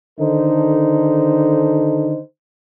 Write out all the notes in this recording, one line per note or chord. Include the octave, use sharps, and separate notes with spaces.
D3 D#3 D#4 A4 C5